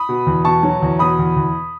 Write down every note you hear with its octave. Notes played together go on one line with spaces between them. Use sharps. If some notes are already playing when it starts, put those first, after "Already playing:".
Already playing: B5 D#6
B2
E2
B2 A5 C#6
F#3
E2
B2 B5 D#6
E2
E2